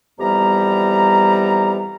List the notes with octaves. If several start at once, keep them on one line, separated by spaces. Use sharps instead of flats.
F2 E3 G3 B3 G4 A#5